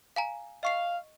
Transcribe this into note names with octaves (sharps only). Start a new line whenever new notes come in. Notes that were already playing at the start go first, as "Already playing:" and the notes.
F5 G#5 A#5
D#5 F5 C#6 C7